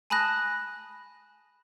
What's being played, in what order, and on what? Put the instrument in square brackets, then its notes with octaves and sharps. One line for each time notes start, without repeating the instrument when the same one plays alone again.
[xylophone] G#5 A5 B5 D#6 F#6 A#6